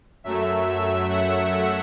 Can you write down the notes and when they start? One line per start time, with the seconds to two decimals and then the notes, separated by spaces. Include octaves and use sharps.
0.24 F#2 F#3 A3 E5
0.67 E5
1.09 F#5